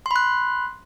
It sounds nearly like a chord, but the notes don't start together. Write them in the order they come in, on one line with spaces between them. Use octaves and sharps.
C6 B5 F#6